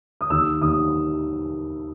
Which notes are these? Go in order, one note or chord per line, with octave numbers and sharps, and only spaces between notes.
D#6
D#2 E6
D#2 D#6